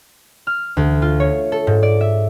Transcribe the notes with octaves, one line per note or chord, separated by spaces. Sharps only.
F6
D2
F4
C#5
A4
G#2
D5
E5